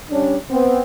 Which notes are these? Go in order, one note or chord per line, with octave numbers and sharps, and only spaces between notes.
G3 C#4 D4
B3 C4